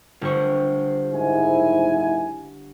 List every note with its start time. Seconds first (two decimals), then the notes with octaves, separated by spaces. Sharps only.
0.22 G1 F4 G4 C5 C#6
1.13 F#1 G#2 E4 G#5